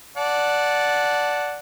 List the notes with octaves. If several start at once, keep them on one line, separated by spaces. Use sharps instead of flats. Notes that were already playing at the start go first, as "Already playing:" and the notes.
D5 F#5 A5